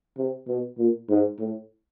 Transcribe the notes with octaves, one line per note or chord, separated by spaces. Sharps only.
C3
B2
A#2
G#2
A2